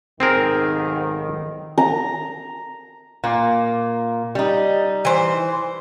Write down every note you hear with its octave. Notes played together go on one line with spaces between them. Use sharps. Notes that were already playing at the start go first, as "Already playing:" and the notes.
B1 G#2 D#3 C4 G#4 A#4
A#5
A#2 A#3
G3 D#4
E3 C5